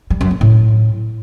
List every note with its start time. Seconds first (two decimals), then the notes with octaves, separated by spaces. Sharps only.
0.10 G3
0.21 F#2
0.31 A#3
0.41 A2